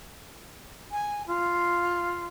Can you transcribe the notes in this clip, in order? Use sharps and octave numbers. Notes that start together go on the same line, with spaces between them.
G#5
F4